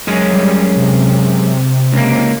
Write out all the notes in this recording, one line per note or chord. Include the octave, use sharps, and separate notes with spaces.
F#2 G#3 C#4
G3
C3
C#2 A#3